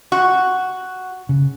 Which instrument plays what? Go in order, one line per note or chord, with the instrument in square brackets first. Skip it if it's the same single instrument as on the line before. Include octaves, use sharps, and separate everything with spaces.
[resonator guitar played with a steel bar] F#4
[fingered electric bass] C#3